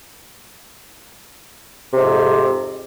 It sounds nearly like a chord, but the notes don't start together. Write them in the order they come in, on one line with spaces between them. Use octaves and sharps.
C3 G#2 F2